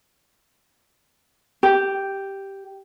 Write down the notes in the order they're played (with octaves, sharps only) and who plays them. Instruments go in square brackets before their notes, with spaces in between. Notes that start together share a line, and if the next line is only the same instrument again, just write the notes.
[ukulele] G4